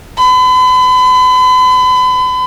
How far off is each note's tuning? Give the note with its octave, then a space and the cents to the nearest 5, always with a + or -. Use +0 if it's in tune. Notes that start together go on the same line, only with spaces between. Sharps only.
B5 +40